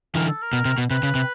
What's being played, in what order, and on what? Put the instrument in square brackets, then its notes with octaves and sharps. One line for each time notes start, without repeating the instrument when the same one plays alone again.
[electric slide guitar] D3 E3 [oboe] A#4
[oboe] A4
A#4
[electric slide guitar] B2
C3
B2
[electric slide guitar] C3 [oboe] B4
[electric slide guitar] C#3
C3